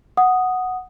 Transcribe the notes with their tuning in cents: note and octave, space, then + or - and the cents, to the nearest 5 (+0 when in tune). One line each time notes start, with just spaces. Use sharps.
F#5 +0 D#6 +0